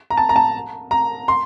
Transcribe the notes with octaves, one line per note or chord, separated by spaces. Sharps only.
A#5
A5
A#5
A5
A#5
C6